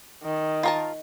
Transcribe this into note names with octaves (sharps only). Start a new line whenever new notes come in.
D#3
F4 A#4 A5